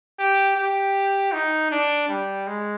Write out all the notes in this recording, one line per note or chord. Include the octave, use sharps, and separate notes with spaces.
G4
G4
D#4
D4
G3
G#3